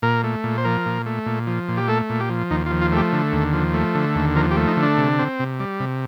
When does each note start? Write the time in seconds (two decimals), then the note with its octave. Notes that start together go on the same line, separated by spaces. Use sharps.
0.02 A#2 A#4
0.24 A3
0.44 A#2
0.58 C5
0.65 F3 A#4
0.86 A#2
1.06 A3
1.26 A#2
1.47 F3
1.69 A#2
1.77 G4
1.88 A3 A4
2.10 A#2
2.20 G4
2.30 F3
2.50 D#2 D#4
2.66 F4
2.71 F3
2.82 F4
2.92 A3 G4
3.13 D3
3.32 D#2
3.53 F3
3.74 A3
3.95 D3
4.15 D#2
4.35 F3 A#4
4.51 G4
4.57 A3
4.68 D#4
4.77 D3
4.82 D4
4.97 C3
5.19 C4
5.39 C3
5.60 G3
5.80 C3